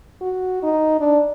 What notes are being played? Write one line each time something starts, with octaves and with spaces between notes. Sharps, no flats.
F#4
D#4
D4